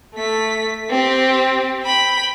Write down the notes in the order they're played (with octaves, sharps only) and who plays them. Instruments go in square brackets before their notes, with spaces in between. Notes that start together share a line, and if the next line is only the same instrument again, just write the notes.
[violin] A3 B6
C4 G4
G5 B5